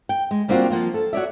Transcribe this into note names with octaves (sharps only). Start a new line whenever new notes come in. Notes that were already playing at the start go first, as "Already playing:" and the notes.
G5
G#3
G3 A#3 C4 D4 F4 F#4
F3 A#3 F4
A4
F#4 C#5 D5 E5